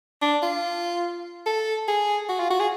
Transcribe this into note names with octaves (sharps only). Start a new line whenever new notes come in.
D4
F4
A4
G#4
F#4
F4
F#4
G#4